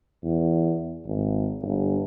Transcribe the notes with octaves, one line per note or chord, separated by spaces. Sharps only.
E2
G#1
G1